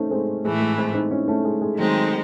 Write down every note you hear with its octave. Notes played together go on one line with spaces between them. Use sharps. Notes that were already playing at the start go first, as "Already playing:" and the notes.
Already playing: A3 C4 C#4 D#4
G#3 C4
A2 E3 G#3 A3
G#3
G#3 C4
C4 D#4
C#4 E4
A3 C#4
G#3
G#3
D#3 F#3 G#3 A3 C4 D#4